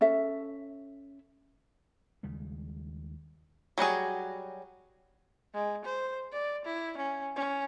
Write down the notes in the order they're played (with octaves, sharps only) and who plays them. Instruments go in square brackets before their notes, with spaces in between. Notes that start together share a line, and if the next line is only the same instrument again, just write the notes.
[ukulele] C#4 A4 E5
[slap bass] D#2 C#3 G3 G#3
[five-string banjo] F#3 G3 F#4 G#4
[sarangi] G#3
C5
D5
E4
C#4
C#4